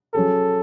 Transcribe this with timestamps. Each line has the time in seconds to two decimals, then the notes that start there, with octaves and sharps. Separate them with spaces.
0.14 F#3 C#4 G#4 A4